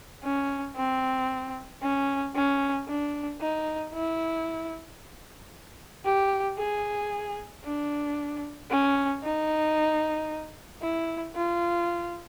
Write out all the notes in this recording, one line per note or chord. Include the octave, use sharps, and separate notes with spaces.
C#4
C4
C#4
C#4
D4
D#4
E4
G4
G#4
D4
C#4
D#4
E4
F4